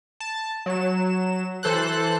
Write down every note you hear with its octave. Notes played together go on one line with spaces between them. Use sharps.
A5
F#3 E7
E3 A4 C5 F#6